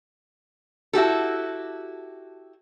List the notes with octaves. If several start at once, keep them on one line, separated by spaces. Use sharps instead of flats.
E4 F#4 G4 A4